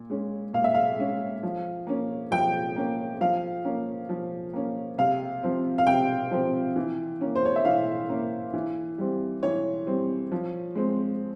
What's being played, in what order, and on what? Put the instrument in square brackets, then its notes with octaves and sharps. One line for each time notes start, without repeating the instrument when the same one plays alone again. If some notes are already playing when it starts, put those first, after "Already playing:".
Already playing: [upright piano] A#2
G#3 C#4
A#2 F5
E5
F5
G#3 C#4
F3
A#3 C#4
F3 G5
A#3 C#4
F3 F5
A#3 C#4
F3
A#3 C#4
C3 F5
F3 C4
F5
C3 G5
F3 C4
E3
A#3 C#4
C5
C#5
E5
E3 F5
A#3 C#4
E3
G3 C4
E3 C#5
G3 C4
F3
G#3 C4